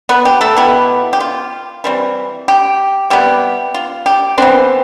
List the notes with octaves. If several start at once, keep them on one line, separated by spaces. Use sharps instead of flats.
B3 B4
G4
A3 A4
B2 B3 E4 G4
G4
F4
E3 G3 C4
G4
C3 G3 B3 G4
F4
G4
E3 B3 C4 D4 C5